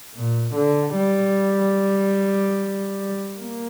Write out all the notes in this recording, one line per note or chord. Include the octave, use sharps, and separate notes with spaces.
A#2
D3
G3
A#3